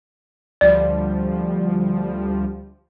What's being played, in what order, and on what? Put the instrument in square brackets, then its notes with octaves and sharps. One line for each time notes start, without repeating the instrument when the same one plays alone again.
[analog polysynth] D2 F3 G3 [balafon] D5